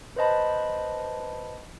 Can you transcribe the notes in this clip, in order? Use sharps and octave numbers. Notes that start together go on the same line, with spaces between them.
B4 C5 D#5 A5 B5